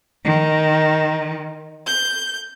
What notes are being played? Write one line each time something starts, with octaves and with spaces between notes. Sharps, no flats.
D#3
G6